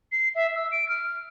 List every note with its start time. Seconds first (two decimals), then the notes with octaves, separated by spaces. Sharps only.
0.12 C7
0.35 E5
0.55 E6
0.72 D7
0.89 F6